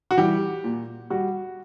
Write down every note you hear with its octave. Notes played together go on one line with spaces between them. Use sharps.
F#4
E3 G3 G4
A#2
G3 F#4